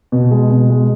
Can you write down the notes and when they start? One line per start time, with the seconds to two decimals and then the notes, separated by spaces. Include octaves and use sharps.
0.12 B2
0.31 G#3
0.50 B2
0.70 G#3